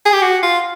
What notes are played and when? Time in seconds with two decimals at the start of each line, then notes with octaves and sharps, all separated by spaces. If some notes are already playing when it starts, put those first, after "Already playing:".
0.05 G#4
0.13 G4
0.22 F#4
0.43 F4